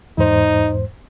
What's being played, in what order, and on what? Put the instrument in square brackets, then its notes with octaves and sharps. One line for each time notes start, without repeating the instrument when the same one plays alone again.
[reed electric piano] E2 G#2 C5 [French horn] D#4